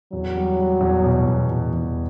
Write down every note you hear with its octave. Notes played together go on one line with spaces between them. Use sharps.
E2 F#3
G3
G3
E2
B2
E2
B2
E2